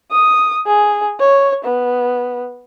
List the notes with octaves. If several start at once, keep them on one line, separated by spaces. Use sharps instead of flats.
D#6
G#4
C#5
B3